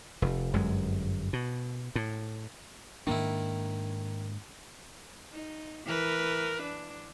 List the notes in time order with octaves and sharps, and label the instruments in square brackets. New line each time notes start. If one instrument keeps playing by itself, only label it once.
[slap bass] F1
G1 F#2 G#3
B2
A2
[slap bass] G#2 A#3 D4 [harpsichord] D#3 E4
[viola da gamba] D#4
E3 A#4 B4
D4